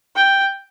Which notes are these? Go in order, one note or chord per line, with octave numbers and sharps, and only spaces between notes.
G5